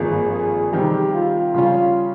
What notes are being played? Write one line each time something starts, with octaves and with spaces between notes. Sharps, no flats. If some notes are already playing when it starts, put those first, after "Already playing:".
Already playing: G#1 G2 F3 A#3 G#4
G#4
C3 D#3 G3 C4 G4
F4
C#3 G3 C#4 F4